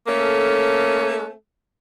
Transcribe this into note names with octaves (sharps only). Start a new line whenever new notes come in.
A3 A#3 C#4 A4